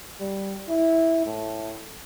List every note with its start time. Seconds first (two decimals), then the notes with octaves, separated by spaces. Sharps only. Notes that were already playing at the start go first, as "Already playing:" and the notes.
0.20 G3
0.68 E4
1.26 A2